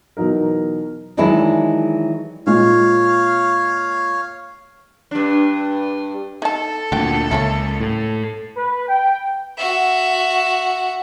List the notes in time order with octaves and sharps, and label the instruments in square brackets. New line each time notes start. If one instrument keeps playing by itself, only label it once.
[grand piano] B2 E3 F#3 D#4 A#4
[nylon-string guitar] D#3 E3 F#3 G#3 D4 E4
[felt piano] A#2 G#3 [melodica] C#5 F5
[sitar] G2 D4
[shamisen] D#4 A5 [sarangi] A4
[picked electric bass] D2 A#2 [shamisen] F#4 G5
[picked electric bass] C#2 [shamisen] A#3 C#4 E4
[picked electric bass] A2
[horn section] B4
G5
[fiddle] F#4 E5